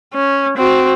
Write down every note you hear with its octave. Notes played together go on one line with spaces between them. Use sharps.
C#4
C4 F#4